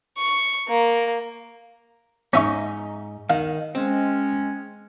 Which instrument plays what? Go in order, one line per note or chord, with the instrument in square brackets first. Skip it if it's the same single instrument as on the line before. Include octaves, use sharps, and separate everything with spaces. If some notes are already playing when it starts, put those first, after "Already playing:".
[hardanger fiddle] C#6
A#3
[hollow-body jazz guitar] G#2 D#4 [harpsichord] C#4 E5 C#6
[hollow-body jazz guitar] D#3 [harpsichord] F5
[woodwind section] G#3 C#4 [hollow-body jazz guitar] C4